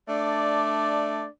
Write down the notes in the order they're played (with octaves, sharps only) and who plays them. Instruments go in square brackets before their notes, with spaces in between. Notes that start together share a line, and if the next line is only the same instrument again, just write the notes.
[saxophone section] A3 D4 D5